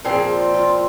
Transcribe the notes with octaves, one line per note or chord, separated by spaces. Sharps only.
A#2 F3 C4 G#4
F4